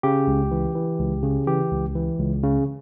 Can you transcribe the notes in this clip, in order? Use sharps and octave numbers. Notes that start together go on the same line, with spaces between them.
C#3 G4
C#2
E3
E3
C#2
C#3
E3 G4
C#2
E3
C#2
C#3